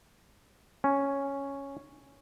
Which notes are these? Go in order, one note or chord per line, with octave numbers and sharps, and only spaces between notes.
C#4